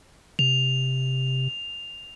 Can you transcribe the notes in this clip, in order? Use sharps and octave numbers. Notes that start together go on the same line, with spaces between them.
C3 F7